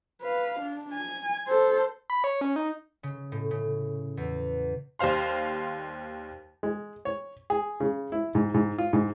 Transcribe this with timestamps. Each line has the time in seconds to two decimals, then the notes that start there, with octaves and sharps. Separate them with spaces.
0.22 B4 F5
0.60 D4
0.93 G#5
1.48 A4 C5
2.10 B5
2.24 C#5
2.41 C#4
2.56 D#4
3.03 C#3
3.32 A2
3.51 C#3
4.17 E2
4.99 D#2 G3 C5 F5 C6
6.63 G#3
7.05 C#5
7.50 G#4
7.80 C#3
8.12 E4
8.35 G#2
8.54 G#2
8.78 F4
8.93 G#2